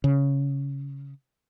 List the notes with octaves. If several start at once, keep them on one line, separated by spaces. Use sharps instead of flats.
C#3